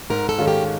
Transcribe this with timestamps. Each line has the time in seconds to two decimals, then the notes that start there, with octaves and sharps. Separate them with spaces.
0.10 G#2 A#4
0.29 A4
0.38 D#3 G#3 C#4 F4
0.48 G4